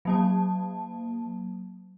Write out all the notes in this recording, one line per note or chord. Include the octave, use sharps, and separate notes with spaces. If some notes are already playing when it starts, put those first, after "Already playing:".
F#3 A#3 A5